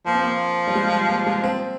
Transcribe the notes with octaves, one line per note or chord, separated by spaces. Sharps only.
F3 A#3
C4
A#3
G3
G#3
A#3
G#3
C4